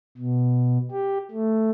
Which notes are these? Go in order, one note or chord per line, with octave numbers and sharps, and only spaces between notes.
B2
G4
A3